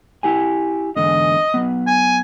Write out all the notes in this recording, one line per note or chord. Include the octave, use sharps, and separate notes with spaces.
E4 G4 G#5
E2 G#2 D3 D#5
F#3 B3
G#5